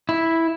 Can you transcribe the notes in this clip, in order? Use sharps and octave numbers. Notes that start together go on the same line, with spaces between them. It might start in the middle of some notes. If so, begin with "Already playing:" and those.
E4